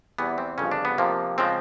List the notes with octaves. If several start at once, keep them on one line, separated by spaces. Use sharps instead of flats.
E2 C3 E3 G3 B3
C4
G1 F2 C#3 C#4
D4
B3
F2 C3 F3 A#3
C#3 F3 G#3 C4